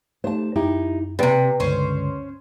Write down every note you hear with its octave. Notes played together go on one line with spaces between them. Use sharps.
A3 D#4 G4 C5 A5
F#2 D#4 E4 G4
A2 C3 B4 D5 G5
C#2 G2 D3 C#4 C5